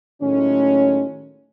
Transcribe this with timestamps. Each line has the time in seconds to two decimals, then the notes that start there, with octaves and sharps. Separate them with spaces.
0.21 A2 D#3 F#3 G#3 A3 C#4